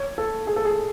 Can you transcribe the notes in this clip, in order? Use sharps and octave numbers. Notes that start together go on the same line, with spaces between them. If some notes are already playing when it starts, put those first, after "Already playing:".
Already playing: C#5
A4
G#4
A4
G#4